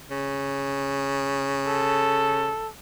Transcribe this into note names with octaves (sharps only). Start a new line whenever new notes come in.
C#3
A4